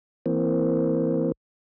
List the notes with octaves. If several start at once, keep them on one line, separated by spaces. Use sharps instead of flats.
E3 A#3 C4